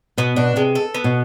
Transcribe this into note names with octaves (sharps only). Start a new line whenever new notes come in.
B2 B3
B2 D4
C3 G#3
A4
B3
B2